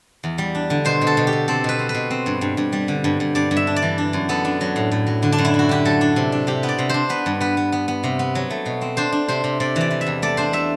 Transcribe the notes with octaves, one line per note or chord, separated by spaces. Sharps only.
E2
G3
D4
D3
B2 C5
B2
A4
B2
G4
B2
C4 A4
B2 B4
C4
B4
B2
C4
G2
G2
G2
G3
D3
G2
G2
G2 D5
G2
E5
D4
D5
E3
D4
F#2
B3 A4
D4
F#3
A2
A2
F#3
D3
D4
F#2
E4
F#2
F#4
D3 G4
F#3 A4
D4
C3
D4
C3 G4
B3
D5
C3
D4 C5
B3 B4
G2
B3 B4
B3
B3
B3
C3
B3
F#3
A3
B2
C4
D4 C5
D4
C3 C5
C3
C3 D5
E3 D5
E3
E5
E2
A3 D5
D4 C5
A3 E5